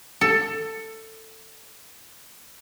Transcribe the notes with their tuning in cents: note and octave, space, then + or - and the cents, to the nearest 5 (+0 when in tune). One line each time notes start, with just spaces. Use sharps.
A4 +15